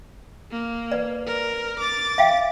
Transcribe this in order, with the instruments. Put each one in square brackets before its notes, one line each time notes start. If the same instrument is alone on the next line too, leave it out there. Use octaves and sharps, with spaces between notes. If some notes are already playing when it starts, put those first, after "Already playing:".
[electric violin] A#3
[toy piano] B4 D5
[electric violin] A#4
D6 A6
[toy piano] E5 F5 G5